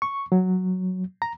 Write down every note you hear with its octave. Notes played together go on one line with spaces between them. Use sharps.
C#6
F#3
A#5